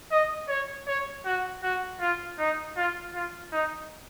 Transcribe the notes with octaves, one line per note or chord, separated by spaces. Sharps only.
D#5
C#5
C#5
F#4
F#4
F4
D#4
F4
F4
D#4